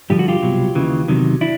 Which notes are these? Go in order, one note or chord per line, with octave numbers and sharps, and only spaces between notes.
G2 D3 F3 G4
F#4
F4 G4
C2 B2 F#3
D#2 C#3 E3
E2 C3 D#3 F#3
D4 E4